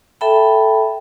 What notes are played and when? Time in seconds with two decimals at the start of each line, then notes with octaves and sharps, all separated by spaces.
0.21 A4 E5 G5 A5 B5